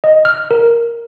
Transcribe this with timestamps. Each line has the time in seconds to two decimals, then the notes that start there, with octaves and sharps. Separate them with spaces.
0.04 D#5
0.25 F6
0.51 A#4